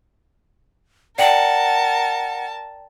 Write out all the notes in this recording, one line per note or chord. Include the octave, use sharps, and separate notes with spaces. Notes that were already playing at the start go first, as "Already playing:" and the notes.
A#4 D5 F#5 G5 A5 F#7